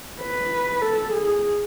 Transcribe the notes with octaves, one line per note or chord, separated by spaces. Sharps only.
B4
A4
G#4